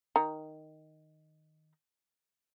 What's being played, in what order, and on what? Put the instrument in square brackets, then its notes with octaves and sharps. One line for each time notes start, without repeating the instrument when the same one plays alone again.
[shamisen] D#3 A#5